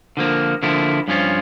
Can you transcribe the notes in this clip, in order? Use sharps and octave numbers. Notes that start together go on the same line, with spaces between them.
D3 F3 A#3
D3 F3 A#3 E4
G2 F3 C#4 F4